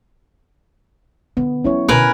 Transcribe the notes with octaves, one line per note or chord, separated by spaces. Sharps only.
D3 B3
F#3 A3 C#4 E4 C#5
B2 D3 A#4 B4 G#5